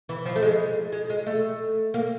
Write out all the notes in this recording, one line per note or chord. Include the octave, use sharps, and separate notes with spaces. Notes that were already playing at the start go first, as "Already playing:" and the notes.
E3
F3
A3
G#3
G#3
G#3
A3
A#3